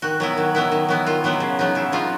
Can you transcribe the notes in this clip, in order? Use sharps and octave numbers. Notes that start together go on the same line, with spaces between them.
D#3 F#4
F#3 B3 E4
D#3
F#3 B3 E4
D#3
F#3 B3 E4
D#3 F4
F#3 B3 E4
C#3
F#3 B3 D#4
C#3 E4
F#3 B3 D#4 F4